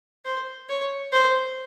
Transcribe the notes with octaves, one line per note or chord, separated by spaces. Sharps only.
C5
C#5
C5